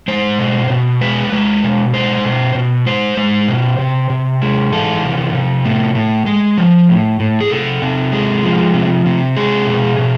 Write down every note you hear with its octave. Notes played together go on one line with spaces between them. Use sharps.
G#3 C5
B2
B2
G#3 B4
G#3
B2
G#3 C5
B2
B2
G#3 C5
G#3
B2
C3
C3
G#3
E3 A4
C3
C3
A2
A2
G#3
F3
A2
A2
G#4
C3 A4
C3
G#3
F3
C3
C3
G#3 G#4
B2
B2